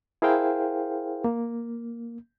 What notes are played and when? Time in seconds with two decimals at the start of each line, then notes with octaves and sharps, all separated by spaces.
0.22 E4 G#4 A#4 C5 F5 G5
1.24 A#3